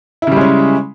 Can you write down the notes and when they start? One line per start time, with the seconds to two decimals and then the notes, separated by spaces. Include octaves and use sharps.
0.22 E4
0.27 C#3
0.32 G3
0.36 G#3
0.41 C#4